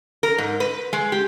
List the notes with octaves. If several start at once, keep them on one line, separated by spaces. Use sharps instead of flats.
A#4
G#2
B4
G#3
G4